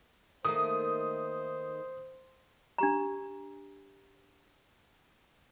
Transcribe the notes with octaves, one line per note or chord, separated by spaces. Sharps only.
D#3 A3 A#3 C5 D#6
D4 G4 A#5